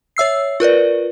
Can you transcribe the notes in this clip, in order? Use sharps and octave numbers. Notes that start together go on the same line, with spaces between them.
C#5 E5 E6 C7
F4 A#4 B4 D5